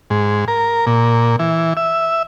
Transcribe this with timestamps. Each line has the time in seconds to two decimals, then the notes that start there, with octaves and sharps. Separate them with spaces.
0.10 G#2
0.48 A#4
0.87 A#2
1.39 E3
1.77 E5